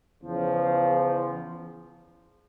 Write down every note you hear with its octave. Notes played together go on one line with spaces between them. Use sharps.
E2 C#3 F3